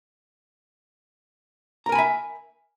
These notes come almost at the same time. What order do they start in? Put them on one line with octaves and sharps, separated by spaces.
A#5 A#4 G#5 B5 E5